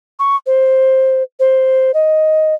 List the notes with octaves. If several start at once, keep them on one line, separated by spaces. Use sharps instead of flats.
C#6
C5
C5
D#5